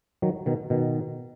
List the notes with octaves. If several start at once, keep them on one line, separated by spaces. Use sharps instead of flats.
D#3 F#3
B2 D#3
B2 D#3